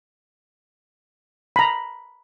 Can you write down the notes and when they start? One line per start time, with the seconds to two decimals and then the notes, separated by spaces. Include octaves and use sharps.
1.56 A#5 B5